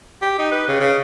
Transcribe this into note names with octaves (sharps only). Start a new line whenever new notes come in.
G4
D#4
B4
C#3
C#3